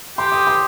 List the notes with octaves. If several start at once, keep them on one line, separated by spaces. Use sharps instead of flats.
G4 C6
D#6
C6